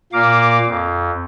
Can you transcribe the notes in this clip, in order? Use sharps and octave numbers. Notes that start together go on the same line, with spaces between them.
A#2 A#3 F5 D6
F2